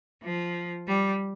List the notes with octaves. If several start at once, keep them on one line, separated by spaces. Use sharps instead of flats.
F3
G3